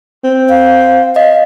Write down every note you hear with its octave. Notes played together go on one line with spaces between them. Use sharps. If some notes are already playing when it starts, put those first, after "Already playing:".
C4
F5
D#5 F5